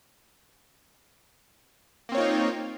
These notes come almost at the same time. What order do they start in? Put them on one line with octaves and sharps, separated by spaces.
A#3 C4 C#5 F4 D#4